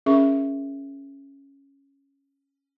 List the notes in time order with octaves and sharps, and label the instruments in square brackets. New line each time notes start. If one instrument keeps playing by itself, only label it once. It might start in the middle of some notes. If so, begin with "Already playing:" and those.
[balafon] C#4 G#4 A#4 E5 C#6